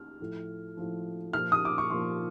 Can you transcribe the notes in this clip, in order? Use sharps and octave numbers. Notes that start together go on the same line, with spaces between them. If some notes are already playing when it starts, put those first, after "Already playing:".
Already playing: F6
A2 F3
A2 F3
A#2 F3 F6
D#6
D6
C#6
A#2 F3 C6